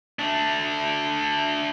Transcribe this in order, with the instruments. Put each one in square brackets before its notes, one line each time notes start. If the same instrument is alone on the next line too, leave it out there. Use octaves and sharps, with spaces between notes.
[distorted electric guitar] A3 D4